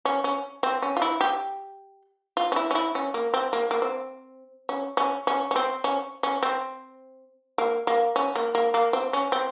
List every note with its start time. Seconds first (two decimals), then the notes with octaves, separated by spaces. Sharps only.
0.05 C#4
0.24 C#4
0.63 C4
0.82 C#4
0.97 F4
1.02 E4
1.21 G4
2.37 F4
2.52 C#4
2.56 E4
2.71 C#4
2.75 E4
2.95 C#4
3.14 A#3
3.34 C4
3.53 A#3
3.71 A#3
3.82 C4
4.69 C#4
4.97 C#4
5.27 C#4
5.51 C#4
5.56 C4
5.84 C#4
6.23 C#4
6.43 C4
7.58 A#3
7.87 A#3
8.16 C#4
8.36 A#3
8.55 A#3
8.74 A#3
8.93 C4
9.13 C#4
9.32 C4